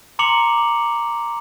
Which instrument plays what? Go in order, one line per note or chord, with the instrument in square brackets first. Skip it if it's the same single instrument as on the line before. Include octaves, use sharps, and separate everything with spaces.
[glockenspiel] A#5 C6 D6 C#7 F7 F#7